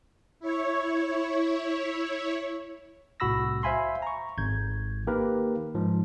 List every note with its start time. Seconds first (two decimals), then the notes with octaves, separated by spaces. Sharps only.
0.40 E4 C#5
3.20 C2 A2 F#4 B5 E6 A#6
3.63 C5 E5 F5 G#5 B5 C6
4.02 A#5 C#6
4.38 G#1 G6 G#6
5.07 D#3 A#3 G4 A#4 B4
5.75 G#2 F3